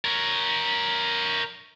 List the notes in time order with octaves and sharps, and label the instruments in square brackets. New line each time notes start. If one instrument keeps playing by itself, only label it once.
[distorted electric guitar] A#4 C#5